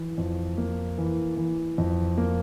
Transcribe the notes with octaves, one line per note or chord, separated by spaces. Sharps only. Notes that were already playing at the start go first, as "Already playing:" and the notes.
Already playing: E3
F2
A#3
E3
E3
F2
A#3